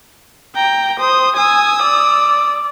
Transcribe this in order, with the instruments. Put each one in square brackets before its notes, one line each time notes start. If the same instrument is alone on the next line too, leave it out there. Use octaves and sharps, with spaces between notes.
[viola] G5 [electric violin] A#5
[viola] C5 [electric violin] D#6
[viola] G#5 [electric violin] D#6 E6
[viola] D5